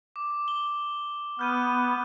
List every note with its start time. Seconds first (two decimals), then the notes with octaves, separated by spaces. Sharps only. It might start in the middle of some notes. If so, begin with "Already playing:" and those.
0.16 D6
0.48 G7
1.39 B3 F6 G6 D#7